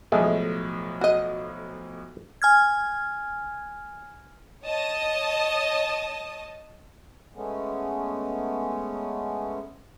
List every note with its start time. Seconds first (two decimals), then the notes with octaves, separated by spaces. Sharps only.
0.12 B1 A2 F3 G#3 A3
1.01 F#4 D#5
2.42 G#5 F6 G#6
4.64 C#5 D#5 A5 D#6
7.33 G#3 A3 B3 C#4